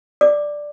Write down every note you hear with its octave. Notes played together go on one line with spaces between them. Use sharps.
D5 D6